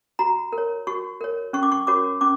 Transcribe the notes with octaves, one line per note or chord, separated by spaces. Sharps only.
F#4 A#5
A#4
C#5
F#4 C#6
A#4 C#5
C#4 C#6
D6
C#6
F#4 A#4 C#5 D6
C#4 D6